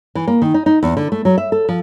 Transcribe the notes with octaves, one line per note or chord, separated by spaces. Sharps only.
E3
A#3
D#3
D#4
D#4
E2
D3
A3
F#3
E5
A4
F3